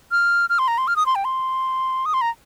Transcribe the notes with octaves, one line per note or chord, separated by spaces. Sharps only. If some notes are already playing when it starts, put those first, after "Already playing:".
F6
F6
C6
A#5
C6
F6
D#6
C6
G5
C6
D#6
C6
A#5